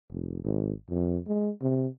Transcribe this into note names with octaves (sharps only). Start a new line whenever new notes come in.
F1
G#1
F2
G#3
C3